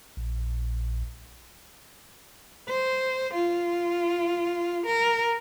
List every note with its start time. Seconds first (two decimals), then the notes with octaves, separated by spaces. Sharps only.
0.17 A#1
2.69 C5
3.33 F4
4.86 A#4